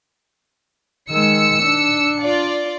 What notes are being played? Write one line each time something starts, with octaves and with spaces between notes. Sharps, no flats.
D#3 G#3 E6 C#7
D4
F4 D5